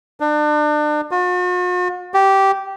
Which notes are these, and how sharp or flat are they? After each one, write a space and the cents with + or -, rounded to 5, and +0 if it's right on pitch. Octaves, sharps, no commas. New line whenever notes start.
D4 +35
F#4 -45
G4 -10